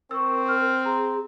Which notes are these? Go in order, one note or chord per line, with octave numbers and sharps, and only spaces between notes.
C4 A#4 C#6 E6
F6
G#4 A#5 C6